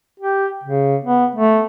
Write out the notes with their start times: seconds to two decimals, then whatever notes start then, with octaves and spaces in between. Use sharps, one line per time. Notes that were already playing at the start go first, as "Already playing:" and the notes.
0.20 G4
0.64 C#3
1.04 B3
1.36 A3